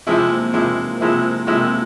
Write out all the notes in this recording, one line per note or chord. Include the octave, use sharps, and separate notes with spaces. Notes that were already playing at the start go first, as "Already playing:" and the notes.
C3 F3 G#3 C4 E4
C4
A#3
C3 F3 G#3 E4
C3 F3 G#3 E4
C3 F3 G#3 E4